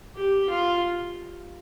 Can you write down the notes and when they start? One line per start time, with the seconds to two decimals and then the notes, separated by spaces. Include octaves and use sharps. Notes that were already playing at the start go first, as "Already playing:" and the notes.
0.16 G4
0.49 F4